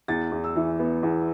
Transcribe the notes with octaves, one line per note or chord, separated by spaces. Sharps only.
E2 A6
E2
E6
E3
B3
E2